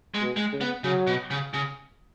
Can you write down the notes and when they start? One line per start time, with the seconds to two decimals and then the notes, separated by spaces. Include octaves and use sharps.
0.14 G#3
0.22 B2
0.37 G#3
0.53 C#3
0.61 B3
0.84 C#3 F#3
1.07 B2
1.30 C#3
1.54 C#3